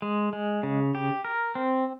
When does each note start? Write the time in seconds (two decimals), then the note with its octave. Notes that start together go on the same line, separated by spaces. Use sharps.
0.02 G#3
0.33 G#3
0.63 C#3
0.95 G4
1.25 A#4
1.55 C4